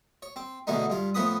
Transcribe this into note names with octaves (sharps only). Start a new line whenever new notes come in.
C#5
C4
E2 B2 D3 A3 D#4
G2 F4
A2 F3 B3 B4 B5 D#6